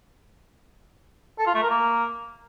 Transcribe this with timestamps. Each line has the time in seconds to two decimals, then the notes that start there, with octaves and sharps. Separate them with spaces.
1.39 A4
1.46 F4
1.54 A3
1.62 A#4
1.70 A#3